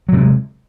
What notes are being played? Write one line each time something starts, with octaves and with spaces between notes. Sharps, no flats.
C3 F#3 G#3